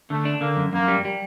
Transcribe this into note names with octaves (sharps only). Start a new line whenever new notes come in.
D3 A3
D4
D3 A#3
F#2
F#2 A#3
G3
G3